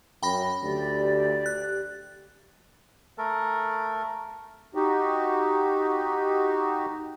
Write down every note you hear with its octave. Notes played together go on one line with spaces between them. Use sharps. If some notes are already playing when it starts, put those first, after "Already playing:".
F#2 G5 B5 A#6
D2 G4 D5
F#6
A3 A4 A#4
D#4 F#4 G4